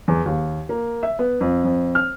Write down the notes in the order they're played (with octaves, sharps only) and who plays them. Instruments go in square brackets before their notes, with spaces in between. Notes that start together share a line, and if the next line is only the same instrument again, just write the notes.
[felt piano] E2
D#2
A#3
E5
B3
F2
F2
F6